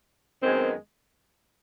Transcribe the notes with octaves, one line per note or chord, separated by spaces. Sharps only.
F#2 D#3 G#3 B3 C4